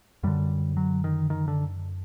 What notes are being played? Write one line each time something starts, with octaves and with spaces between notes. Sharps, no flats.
F#2 D3 G3
F#3
D#3
D#3
D3